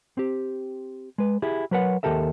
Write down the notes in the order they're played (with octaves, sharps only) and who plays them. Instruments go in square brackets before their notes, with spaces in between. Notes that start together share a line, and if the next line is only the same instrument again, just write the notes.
[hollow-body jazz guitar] C4 G4
G#3 B4
E4 G4 G#4
F#3 A#4 B4 C#5 F#5
D#2 F#3 G4 A4 A#4 E5